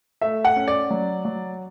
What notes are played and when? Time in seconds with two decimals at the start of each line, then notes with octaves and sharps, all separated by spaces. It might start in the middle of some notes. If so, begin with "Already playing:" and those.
0.21 A3 E5
0.45 F#5
0.56 C#4
0.68 D5
0.90 F#3
1.25 F#3